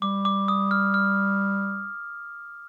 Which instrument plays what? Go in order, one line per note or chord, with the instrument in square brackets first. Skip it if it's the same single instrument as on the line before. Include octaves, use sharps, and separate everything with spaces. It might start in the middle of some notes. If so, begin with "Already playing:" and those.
[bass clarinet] G3 [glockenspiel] D6
[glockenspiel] D6
D#6
F6
F6